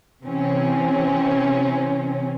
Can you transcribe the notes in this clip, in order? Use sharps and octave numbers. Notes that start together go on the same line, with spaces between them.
C3 E3 C4 C#4